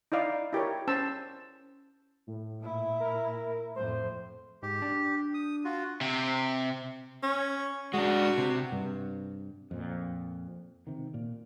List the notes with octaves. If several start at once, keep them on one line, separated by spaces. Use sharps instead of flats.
D#4 E4 D5 F5
E4 G4 A#4 C#5
C#4 C5 A5 E6
A2
A#2 E4
A#4
F2 A2 C5
G#2 G4
D4
D#6
F4 F#4
C3
C#4
G#3 D4 F#4
C3
G2 C3
F2 A#2
C3 D#3
A#2